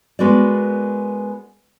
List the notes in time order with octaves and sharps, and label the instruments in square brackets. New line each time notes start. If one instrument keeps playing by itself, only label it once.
[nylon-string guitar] G#3 B3 F#4 A#4 D5